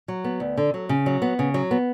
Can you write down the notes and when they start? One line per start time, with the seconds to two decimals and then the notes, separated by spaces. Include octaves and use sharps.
0.08 F#3
0.24 B3
0.40 D2
0.57 D3
0.74 F#3
0.89 C#3
1.06 F#3
1.22 B3
1.39 C#3
1.54 F#3
1.71 B3